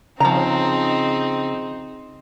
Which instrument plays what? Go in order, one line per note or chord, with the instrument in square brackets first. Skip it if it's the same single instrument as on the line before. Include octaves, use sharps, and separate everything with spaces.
[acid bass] C#3 [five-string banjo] F3 A#5 [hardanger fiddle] C4 D#4